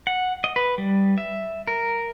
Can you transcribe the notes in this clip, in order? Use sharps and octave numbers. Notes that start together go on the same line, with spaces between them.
F#5
D#5
B4
G3
E5
A#4